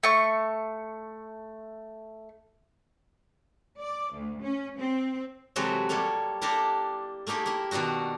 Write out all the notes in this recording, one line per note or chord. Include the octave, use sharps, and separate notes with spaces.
A3 C#6
D5
D2
C#4
C4
C3 E3 F#3 G#3 F#4 A4
G3 A#3 A4 C#5
A#3 D4 E4 G4 A4 A#5
A3 A#3 D#4 G4 G#4
A#3 E4
B2 D#3 D4 D#4 F#4